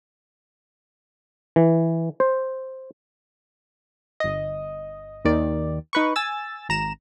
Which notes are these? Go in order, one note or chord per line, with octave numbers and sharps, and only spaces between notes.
E3
C5
G1 D#5
D#2 D#3 D5
D#4 B4 C#6
G#5 E6 A6
G#1 A#5 E7